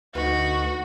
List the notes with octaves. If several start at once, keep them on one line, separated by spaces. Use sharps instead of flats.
D2 D#4 F#4 B4